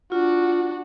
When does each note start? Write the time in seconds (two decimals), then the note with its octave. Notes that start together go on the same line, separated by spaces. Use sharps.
0.12 D4 F4 F#4